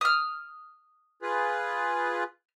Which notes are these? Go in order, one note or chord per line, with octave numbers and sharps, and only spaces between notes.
D#6 F6
F4 G#4 B4